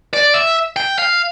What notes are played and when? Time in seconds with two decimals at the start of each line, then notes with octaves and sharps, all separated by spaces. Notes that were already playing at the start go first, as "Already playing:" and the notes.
0.14 D5
0.34 E5
0.76 G5
0.98 F5